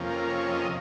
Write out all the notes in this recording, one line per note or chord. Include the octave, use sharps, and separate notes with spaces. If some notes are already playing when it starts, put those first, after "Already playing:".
Already playing: F2 C3 F3 A#3 C#4
A#4
C#5
D#5